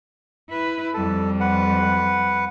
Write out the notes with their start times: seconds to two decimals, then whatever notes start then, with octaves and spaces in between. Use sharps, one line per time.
0.49 E4 B4
0.94 F2 G3 A4
1.40 B4 F#5